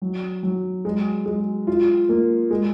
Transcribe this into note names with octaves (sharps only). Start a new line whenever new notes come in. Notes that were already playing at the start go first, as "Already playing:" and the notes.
F#3
F#3
G#3
G#3
F4
A#3
G#3